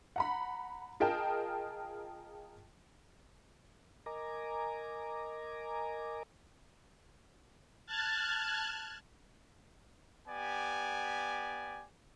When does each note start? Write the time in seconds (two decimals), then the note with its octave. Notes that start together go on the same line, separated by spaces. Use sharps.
0.16 F#5 A#5 B5
1.00 F4 G#4 A#4 D#5 G5 A5
4.06 A#4 D#5 G#5 A#5 D6
7.86 A5 F6 F#6 G#6 A6
10.27 B3 G4 D5 G#5